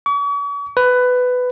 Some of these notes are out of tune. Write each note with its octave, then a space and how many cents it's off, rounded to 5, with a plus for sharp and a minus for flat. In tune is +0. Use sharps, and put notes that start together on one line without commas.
C#6 +45
B4 +15